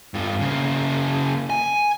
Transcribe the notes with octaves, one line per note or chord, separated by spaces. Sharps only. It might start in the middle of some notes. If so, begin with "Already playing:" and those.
G2 F4
C#3 A#3
G#5